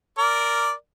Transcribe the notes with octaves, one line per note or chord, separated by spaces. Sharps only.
A#4 D5